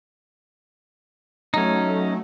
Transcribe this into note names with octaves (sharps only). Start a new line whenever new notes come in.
F#3 A3 C#4 D#4